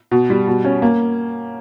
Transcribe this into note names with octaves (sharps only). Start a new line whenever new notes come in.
B2
G3
B2
C#4
A#3